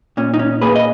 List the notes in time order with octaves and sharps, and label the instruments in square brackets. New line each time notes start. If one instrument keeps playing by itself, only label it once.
[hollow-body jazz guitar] A#2 C#4
D#4
C#4
A#3 G#4 B4
D#5